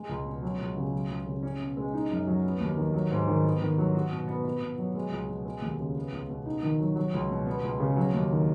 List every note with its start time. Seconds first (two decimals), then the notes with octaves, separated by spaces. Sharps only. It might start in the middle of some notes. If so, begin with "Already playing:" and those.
Already playing: G#3
0.09 C#2
0.26 B2
0.43 F#3
0.59 C#2
0.76 C#3
0.93 F#3
1.09 C#2
1.26 C#3
1.43 C#4
1.60 B2
1.77 G#3
1.94 D#4
2.11 F#2
2.27 F#3
2.44 B3
2.60 D#2
2.77 D#3
2.94 F#3
3.11 G#2
3.28 D#3
3.45 B3
3.61 D#3
3.78 F#3
3.95 F#4
4.11 B2
4.28 B3
4.45 B3
4.61 B2
4.78 F#3
4.94 G#3
5.12 C#2
5.28 B2
5.45 G#3
5.62 D#2
5.79 C#3
5.96 B3
6.12 C#2
6.29 B2
6.46 D#4
6.63 D#3
6.80 F#3
6.96 F#3
7.13 C#2
7.30 B2
7.46 B3
7.63 C#2
7.80 C#3
7.96 F#3
8.14 D#2
8.31 D#3